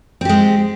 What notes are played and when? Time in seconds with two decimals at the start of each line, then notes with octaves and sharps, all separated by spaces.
0.21 C4
0.25 G4
0.29 G#3